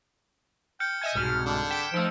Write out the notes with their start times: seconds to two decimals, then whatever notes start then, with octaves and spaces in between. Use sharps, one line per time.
0.80 G5 F6 G6 C#7
1.02 D#5 E5 G#5 G#6
1.15 C2 G#2 B2 F6
1.46 D3 D4
1.70 G5 B6 E7
1.94 F3 A3 D#4 E6 D7